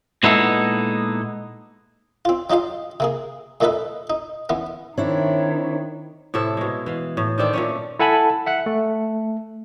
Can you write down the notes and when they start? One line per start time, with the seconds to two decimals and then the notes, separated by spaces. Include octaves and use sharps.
0.23 A#2 G#3 B3 D#4 E4 A4
2.25 C4 F4
2.50 F#3 D#4 F4 G4 F5
3.00 C3 A#3 G#4
3.61 F#2 A#2 A3 D#4 A4 B4
4.10 D#4
4.49 E3 B3 C#4
4.97 D#3 C4 D4 E4 C#5
6.34 A2 C3 E4 A4
6.57 B2 G#3
6.86 E3 F5
7.17 A2
7.38 D#3 C4 D4 A4
7.53 A#2 A3 C#4
7.99 E4 A4 F#5 G#5 A5 B5
8.46 E5 F#5 F#6
8.66 A3